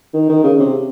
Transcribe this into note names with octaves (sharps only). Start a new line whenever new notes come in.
D#3
D#3
C#3
C3